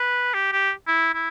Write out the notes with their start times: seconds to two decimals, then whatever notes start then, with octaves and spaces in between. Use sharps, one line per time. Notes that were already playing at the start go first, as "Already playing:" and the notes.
Already playing: B4
0.34 G4
0.52 G4
0.87 E4
1.14 E4